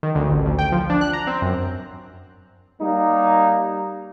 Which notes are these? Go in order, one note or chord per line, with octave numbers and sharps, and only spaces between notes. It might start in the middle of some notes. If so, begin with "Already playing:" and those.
D#3
D2
A1
D2
G5
F3
D4
F#6
A#5
C4
F#2
G3 A#3 D#4